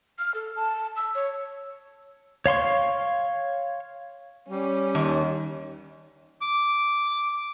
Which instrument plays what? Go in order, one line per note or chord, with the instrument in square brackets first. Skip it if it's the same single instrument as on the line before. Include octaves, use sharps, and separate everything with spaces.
[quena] F6
A4
A5
E6
C#5
[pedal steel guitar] C#5 F5 C6 C#6
[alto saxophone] G3 [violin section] C#4
[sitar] D#2
[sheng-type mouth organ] D6